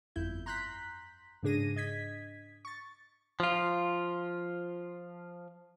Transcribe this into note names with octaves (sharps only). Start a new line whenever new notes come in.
G1 F2 E4 G6
A#5 C6 F#6 G6 B6
G#2 C#3 D4 G#4 A#6 D#7
D#5 G#6 B6
C#6 A6
F3 F4